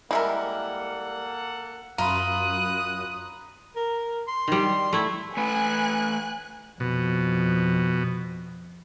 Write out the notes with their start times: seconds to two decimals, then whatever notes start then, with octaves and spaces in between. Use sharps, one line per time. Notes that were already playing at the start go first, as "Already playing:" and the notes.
0.11 G3 G#3 A#3 E4 A4 A#4 F#5
1.98 F#2 F4 A#5 B5 D#6 F#6
3.76 A#4
4.28 C6
4.48 D#3 G3
4.93 A3 E4
5.37 A3 B4 G#5 F#6
6.80 F2 B2